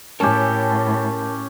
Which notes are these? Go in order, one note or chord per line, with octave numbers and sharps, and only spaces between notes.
A2 C#4 G4 A#4 G#5 A5